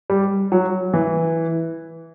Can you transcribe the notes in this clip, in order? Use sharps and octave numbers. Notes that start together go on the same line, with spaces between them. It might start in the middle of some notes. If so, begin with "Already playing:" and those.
G3
F#3
E3